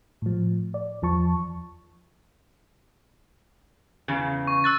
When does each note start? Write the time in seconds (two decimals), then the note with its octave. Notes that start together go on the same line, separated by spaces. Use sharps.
0.22 A2 F3
0.74 D5
1.02 E2 F3 A5 C#6
4.08 E2 C#3
4.47 C#6
4.64 E6 F#6 A6